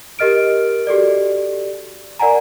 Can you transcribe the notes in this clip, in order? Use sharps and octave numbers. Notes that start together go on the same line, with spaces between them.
G4 A#4 D#5 F6 D7
F#4 G4 A4 D5
A#4 D5 F#5 G#5 A#5